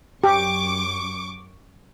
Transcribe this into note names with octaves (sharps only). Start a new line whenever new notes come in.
F#2 G4 C#6 D6